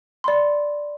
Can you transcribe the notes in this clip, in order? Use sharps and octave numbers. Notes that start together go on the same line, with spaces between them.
D5 B5 C6